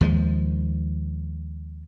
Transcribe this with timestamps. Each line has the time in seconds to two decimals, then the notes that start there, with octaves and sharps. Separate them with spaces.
0.01 D#2 F3 F#3 G#3